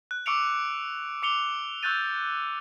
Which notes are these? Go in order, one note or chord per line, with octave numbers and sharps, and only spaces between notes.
F#6
C#6 D6 E6 C#7 D7 F7
D6 C#7 F7 G7
C#6 E6 F#6 G6 A6 D#7